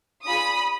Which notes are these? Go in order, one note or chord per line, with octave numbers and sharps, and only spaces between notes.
D4 F4 G#4 B5 D#6